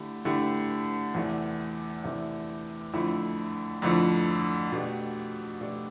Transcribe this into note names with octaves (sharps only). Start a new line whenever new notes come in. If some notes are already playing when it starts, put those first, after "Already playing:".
Already playing: D3 A3 E4 G4
D3 A3 E4 G4
E2 C3 E3 A3
E2 C3 E3 A3
F2 D3 F3 A3 E4
F2 D3 F3 A3 E4
B2 A3 D4 G4
B2 A3 D4 G4